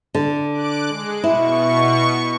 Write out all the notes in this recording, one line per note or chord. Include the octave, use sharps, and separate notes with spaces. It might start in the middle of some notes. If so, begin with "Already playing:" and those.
D3
D6 F#6 D7
G#3
B2 E4 C#6